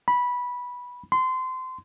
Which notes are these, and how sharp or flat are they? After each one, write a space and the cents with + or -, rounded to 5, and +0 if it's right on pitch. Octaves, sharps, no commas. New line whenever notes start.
B5 -10
C6 -25